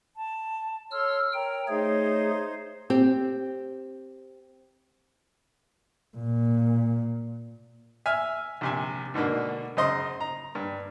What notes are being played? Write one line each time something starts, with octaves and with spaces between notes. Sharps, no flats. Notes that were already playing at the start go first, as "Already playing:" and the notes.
A5
A4 C#5 C6 E6 F6
A#4 C#5 G5 A#5
A3 D#4 G#4 C5 C#5 G#6
C4 G4
A#2
E5 G#5 E6 F6
A#1 C3 G#5
G#2 B2 D3 A#3
F#2 C#3 C5 D#5 C6
A#5
G2